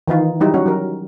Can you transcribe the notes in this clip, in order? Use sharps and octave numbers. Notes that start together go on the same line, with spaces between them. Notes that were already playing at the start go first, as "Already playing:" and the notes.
D#3 E3 D#4 F4
F#3 G3 D#4 E4
C#4 F#4
F#3 A#4